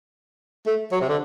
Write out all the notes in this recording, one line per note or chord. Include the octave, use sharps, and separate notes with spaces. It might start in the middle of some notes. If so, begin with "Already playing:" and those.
A3
F#3
C3
D3